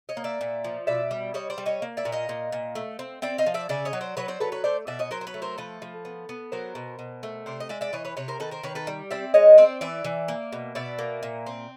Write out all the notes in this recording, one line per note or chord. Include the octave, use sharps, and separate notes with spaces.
C#5 D#5
A#3
D5 E5
A#2
F3
B2 D5 E5
G3
G3 C#5 D#5
C5 D5
G3
C#5 D#5
A#3
D5 E5
A#2
D#5 F5
A#2
A#2
A3
C4
C4 D5 E5
D#5 F5
F3
D5 E5
C#3 D5 E5
C#5 D#5
F#3
C5 D5
F#3 B4 C#5
C5 D5
F#3 A4 B4
B4 C#5
A3 C5 D5
B2 D5 E5
C#5 D#5
F#3 A#4 C5
C5
B4 C#5
A3
A#4 C5
F3 A4 B4
F3
B3
B3
F#3 A#4 C5
B2
B2
A3
C3 C5 D5
D#5
G#3 D5 E5
D5 E5
E3 C#5 D#5
B4 C#5
C3 B4 C#5
A#4 C5
D#3 A4 B4
A#4 C5
D#3 B4 C#5
A4 B4
G3
C4 D5 E5
G#3 C#5 D#5
C4 C5 D5
E3 D5 E5
E3
A#3
B2
B2 D5 E5
A#3
A#2
C4